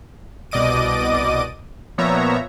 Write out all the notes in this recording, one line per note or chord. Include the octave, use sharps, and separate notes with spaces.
C2 B2 D5 D#5 D6 D#7
A#2 F3 B3 C#5 E5 A#5